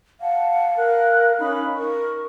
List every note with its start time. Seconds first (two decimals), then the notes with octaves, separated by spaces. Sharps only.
0.21 F5 F#5 A5
0.76 A#4 F#6
1.39 C#4 D#4 B5
1.75 A#4 C#6